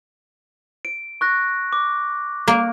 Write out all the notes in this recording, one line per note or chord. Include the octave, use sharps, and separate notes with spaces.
D7
C#6 F#6 A#6
D6
A#3